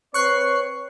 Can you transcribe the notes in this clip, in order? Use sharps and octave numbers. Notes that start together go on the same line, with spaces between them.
C4 B4 C#5 C#6 F#6 C7